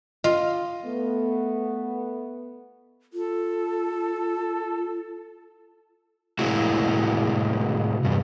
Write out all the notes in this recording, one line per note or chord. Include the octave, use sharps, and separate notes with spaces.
F4 D#5
A3 B3
F4 A4
A2 C3 G#3 A#3 E4 F#4
E2 G2